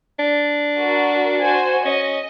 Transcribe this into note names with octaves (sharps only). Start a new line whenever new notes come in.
D4
F#4 A#4
F#4 C5 G#5
C#4 D#5